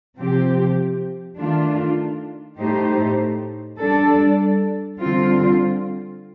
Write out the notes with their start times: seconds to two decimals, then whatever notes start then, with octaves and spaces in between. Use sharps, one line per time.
0.19 C3 F3 C4 G4
1.38 D#3 A3 D4 F4
2.59 A2 A3 D#4 G4 C5
3.79 G3 D4 A4
5.00 D3 G3 C4 F4